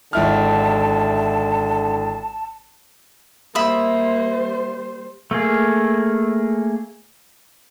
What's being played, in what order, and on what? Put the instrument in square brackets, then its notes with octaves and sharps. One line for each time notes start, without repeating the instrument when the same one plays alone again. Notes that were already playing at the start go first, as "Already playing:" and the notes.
[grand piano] G#1 E4 F6 [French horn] D3 [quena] A5
[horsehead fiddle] G3 C5 [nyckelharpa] A#3 [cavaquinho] E5 B5 D#6
[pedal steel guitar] A3 A#3 G#4